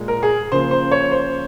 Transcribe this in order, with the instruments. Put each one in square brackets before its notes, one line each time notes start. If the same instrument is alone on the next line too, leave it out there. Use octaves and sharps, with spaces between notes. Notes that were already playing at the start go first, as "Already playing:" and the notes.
Already playing: [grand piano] A#2 G#3
A#4
G#4
C#3 F3 A#3 C5
C5
C#5
C5